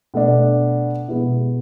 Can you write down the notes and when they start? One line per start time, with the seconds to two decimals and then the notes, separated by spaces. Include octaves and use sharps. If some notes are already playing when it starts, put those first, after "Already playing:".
0.14 B2 A3 D4
1.08 B2 G#3 B3 E4